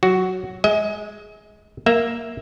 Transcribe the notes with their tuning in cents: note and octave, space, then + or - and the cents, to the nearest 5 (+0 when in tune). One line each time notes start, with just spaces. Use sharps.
F#3 +0 F#4 +5
G#3 +0 D#5 +40
A#3 +0 E5 +0